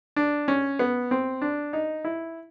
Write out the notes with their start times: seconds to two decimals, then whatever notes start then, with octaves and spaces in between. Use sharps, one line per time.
0.16 D4
0.48 C#4
0.79 B3
1.11 C4
1.42 D4
1.73 D#4
2.05 E4